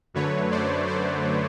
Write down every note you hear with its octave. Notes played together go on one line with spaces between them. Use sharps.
F#2 D3 F#3 A3 B4 C#5
C5 D5
C5 D5